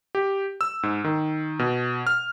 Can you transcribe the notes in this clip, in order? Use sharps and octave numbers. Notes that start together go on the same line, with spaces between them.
G4
E6
G#2
D#3
B2
F6